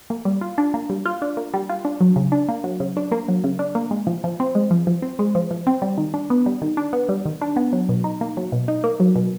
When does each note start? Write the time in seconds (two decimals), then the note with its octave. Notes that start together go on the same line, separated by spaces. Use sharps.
0.10 A#3
0.25 G3
0.41 F4
0.58 D4
0.74 A#3
0.90 G3
1.05 F4
1.22 D4
1.37 A#3
1.54 G3
1.69 F4
1.85 D4
2.00 F#3
2.16 C#3
2.32 D4
2.48 A#3
2.64 F#3
2.80 C#3
2.97 D4
3.12 A#3
3.28 F#3
3.44 C#3
3.59 D4
3.75 A#3
3.91 G#3
4.07 F3
4.24 F3
4.40 C4
4.55 G#3
4.71 F3
4.87 F3
5.02 C4
5.19 G#3
5.35 F3
5.51 F3
5.67 C4
5.82 G3
5.97 D#3
6.14 D4
6.30 B3
6.46 G3
6.62 D#3
6.77 D4
6.93 B3
7.09 G3
7.26 D#3
7.41 D4
7.56 B3
7.73 F#3
7.89 B2
8.04 D#4
8.21 A#3
8.37 F#3
8.52 B2
8.68 D#4
8.84 A#3
9.00 F#3
9.15 B2